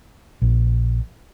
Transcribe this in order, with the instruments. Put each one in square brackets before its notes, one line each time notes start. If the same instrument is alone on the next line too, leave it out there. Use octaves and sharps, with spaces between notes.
[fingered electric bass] A#1